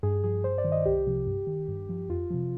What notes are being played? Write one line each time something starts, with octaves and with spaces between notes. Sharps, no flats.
G2 G#4
F3 G#4
G2 C5
D5
D#3
D#5
C2 G4
C3 F3
G2
D#3
G2
F3
F2 F4
C3 F3